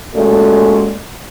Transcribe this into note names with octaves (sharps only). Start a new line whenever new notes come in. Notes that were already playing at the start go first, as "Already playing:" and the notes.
A#2 G#3 A3 C#4 F#4 A4